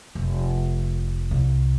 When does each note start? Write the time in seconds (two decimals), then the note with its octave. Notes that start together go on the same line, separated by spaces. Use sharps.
0.15 F1
1.31 C2